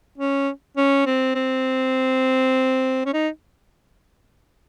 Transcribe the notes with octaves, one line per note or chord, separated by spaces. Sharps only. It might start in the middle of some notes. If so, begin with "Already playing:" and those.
C#4
C#4
C4
C4
C#4
D#4